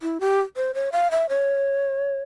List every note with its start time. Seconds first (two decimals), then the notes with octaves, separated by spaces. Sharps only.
0.02 E4
0.20 G4
0.56 C5
0.75 C#5
0.92 F5
1.11 E5
1.29 C#5